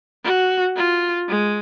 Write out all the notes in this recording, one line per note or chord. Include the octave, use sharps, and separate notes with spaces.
F#4
F4
G#3